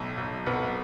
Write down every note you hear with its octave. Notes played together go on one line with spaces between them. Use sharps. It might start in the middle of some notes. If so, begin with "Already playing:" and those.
Already playing: B1 A2
B1
B1 B3